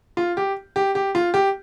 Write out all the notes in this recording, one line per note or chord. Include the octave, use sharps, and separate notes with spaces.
F4
G4
G4
G4
F4
G4